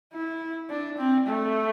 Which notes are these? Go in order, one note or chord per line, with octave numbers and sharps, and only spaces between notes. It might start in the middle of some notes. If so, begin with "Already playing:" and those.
E4
D4
C4
A3